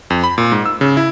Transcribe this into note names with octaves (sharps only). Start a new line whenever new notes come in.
F2
B5
A#2
G#2
E6
C#3
E4